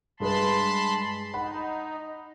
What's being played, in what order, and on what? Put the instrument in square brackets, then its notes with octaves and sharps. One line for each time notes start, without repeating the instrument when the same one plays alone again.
[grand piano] G2 G#3 B4 [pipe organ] A5 B5 C6
[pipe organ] D#4 [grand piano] F#5 B5